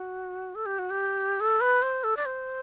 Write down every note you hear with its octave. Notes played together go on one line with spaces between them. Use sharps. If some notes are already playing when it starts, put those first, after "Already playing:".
Already playing: F#4
A4
G4
F#4
G4
A4
B4
C5
A4
D5
C5